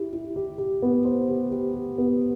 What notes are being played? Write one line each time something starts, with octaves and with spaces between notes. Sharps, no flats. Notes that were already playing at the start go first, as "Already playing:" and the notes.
Already playing: E4 G4
E4
G4
G4
B3
C5
G4
G4
G4
B3